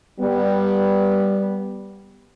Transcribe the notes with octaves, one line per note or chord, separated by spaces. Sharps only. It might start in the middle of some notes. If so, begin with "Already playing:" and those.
G3 B3